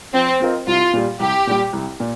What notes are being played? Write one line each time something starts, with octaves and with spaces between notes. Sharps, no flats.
F3 C4
C4 F4 A#4 D#5
C2 F4
A#2 G3
C2 G4
A#2 G3
C2
A#2